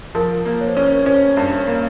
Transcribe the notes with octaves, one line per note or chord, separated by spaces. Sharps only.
F3 A#4
A#3
C#5
C5
C#4 A#4
C5
C#5
C#4 C5
G2
A#3